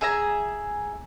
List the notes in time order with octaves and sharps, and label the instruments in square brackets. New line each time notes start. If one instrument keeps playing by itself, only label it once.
[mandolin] G#4 E5 A#5